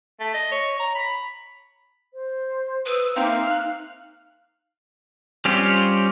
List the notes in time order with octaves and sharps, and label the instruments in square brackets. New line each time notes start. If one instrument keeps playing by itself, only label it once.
[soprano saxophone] A3
D#5
C#5
A#5
B5
[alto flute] C5
[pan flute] B4 [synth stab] D#6 E6
[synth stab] A#3 C4 E5 [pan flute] D#4 [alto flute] F5
[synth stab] F6 F#6
[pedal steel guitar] G3 C4 C#4 F4 G4